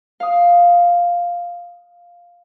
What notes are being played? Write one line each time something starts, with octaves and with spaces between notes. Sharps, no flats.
F5 D#6